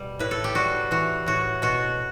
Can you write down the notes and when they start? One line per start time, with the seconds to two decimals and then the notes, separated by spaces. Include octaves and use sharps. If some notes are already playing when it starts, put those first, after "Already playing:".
Already playing: B2 G3
0.19 A2 B4
0.31 A4
0.44 G4
0.55 G3 F#4
0.91 E3 F#4
1.26 A2 F#4
1.62 B2 F#4